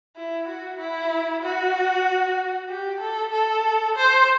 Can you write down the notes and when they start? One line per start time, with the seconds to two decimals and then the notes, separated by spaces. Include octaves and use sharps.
0.16 E4
0.48 F#4
0.79 E4
1.42 F#4
2.69 G4
3.00 A4
3.32 A4
3.96 C5